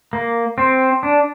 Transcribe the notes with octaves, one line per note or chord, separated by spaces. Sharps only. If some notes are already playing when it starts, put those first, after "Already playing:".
A#3
C4
D4